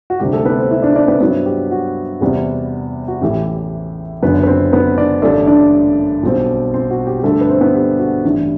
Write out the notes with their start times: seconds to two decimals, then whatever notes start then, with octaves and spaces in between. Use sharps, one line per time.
0.10 F#4
0.20 D2 C3 G3 G4
0.33 A3 A4
0.45 B3 B4
0.58 C4 C5
0.71 E4 E5
0.82 D4 D5
0.95 D4 D5
1.08 B3 B4
1.20 G2 F#3 B3 C4 E4 B4
1.46 G4
1.71 F#4
2.21 E2 C3 G3 B3
3.08 F#4
3.22 A1 A2 E3 G4
4.22 F#1 F#2 D3 B3 B4
4.43 B4
4.47 C4 C5
4.72 B3 B4
4.98 D4 D5
5.22 A1 G2 D3 A3 D4 D5
5.47 D4 D5
6.23 B1 B2 G3 C4
6.74 C4 C5
6.90 F#4
7.07 G4
7.19 G4
7.24 G2 D3 G3 A3 D4 A4
7.41 B4
7.49 C4 C5
7.61 B3 B4
7.74 G4
7.99 F#4
8.24 A1 G2 E3